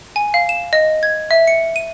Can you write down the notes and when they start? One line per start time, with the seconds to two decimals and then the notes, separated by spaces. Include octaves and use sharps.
0.16 G#5
0.34 F5
0.49 E7
0.73 D#5
1.03 G#6
1.31 E5
1.47 C#7
1.76 D#7